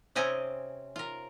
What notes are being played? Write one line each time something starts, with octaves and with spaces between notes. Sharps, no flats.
C3 C4 C#4 D#5 G#5
F4 A#4